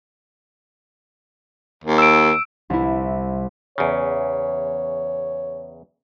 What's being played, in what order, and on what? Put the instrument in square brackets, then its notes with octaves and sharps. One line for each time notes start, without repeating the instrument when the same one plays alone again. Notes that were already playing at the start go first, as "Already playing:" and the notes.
[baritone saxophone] D#2
[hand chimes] E6 D7
[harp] C2 E4
[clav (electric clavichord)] E2 C#3 [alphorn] C#5